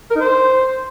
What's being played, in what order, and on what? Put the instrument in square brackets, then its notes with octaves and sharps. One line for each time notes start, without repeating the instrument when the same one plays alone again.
[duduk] A#4
D#4
C5